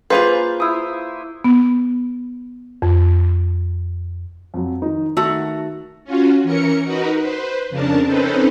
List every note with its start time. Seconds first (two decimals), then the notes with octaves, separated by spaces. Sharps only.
0.10 A#3 F4 G#4 B4 C5 F5
0.60 E4 D#6
1.44 B3
2.82 F2
4.54 F2 F#3
4.82 D#3 D#4
5.17 D#3 A3 F#4 A#5
6.04 C#4 F4 F#4
6.43 E3 C#4 A#4 C#7
6.84 D#4 F#4 A#4 B4
7.19 B4 C5
7.70 F2 C#3 D4 A#4 A5
8.06 C4 C#4 D#4 A4 B4 C5